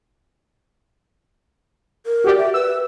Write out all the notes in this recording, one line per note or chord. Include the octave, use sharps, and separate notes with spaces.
A#4
F#4 G4 D5
E5
B4 E6